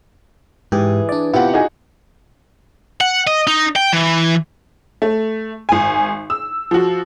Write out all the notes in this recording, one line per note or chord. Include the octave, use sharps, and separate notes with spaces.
G#2 E3 G4 G#4
D4 D5
C3 B3 E4 F4 G4 F#5
D#4 F#4 G#4
F#5
D#5
D#4
G5
E3
A3
G#1 G#5
E6
F3 F#4